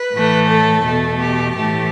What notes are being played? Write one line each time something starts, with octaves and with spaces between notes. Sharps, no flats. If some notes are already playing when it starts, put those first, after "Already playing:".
Already playing: B4
A2 E3 A3
A4
E2 B2 A3
G4
A2 E3 A3 G4